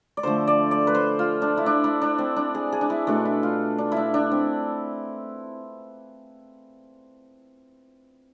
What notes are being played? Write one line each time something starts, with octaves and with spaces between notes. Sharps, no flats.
D5
D3 F3 A3 C5
D5
D5
B4
C5
F4
D4
E4
D4
E4
D4
C4
D4
G#4
G#4
D4
E4
B2 A3 D4
E4
F4
D4
D4 E4
D4
C4